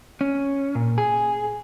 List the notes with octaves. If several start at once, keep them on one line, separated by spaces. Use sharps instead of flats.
C#4
A#2
G#4